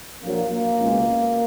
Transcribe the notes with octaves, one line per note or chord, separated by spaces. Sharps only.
A#1 A#2 F#3 A#3
A#3
C#2 B2 G#3